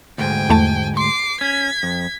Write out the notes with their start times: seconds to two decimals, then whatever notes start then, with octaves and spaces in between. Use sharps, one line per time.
0.18 D2 G#2 G5 G#5
0.50 E2 A3 A5
0.97 C6 D6 C7
1.41 C#4 G#6 B6
1.83 F2